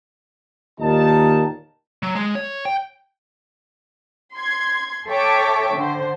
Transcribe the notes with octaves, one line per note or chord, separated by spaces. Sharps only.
D#2 A#2 D#3 D#4 A#4 A5
F#3
G#3
C#5
G5
C6 G#6
A4 C#5 E5 G5 C#6 D6
D3 C5